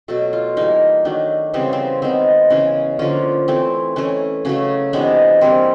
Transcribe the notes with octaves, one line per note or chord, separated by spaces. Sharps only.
B2 F#3 A3 A4
F4
E3 G3 A#3 D#4
D#3 F#3 A3 D4
C#3 E3 G3 B3 C4
C4
D#3 G#3 B3 C4
C#3 E3 G#3 C#4
D3 F3 A#3 C#4
E3 A3 C4
E3 A3 C#4
C#3 F#3 A3 C#4
C3 E3 G#3 B3 D4
E3 G3 A#3 C4